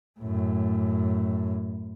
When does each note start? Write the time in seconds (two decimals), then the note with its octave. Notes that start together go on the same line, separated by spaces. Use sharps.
0.20 F#2 A2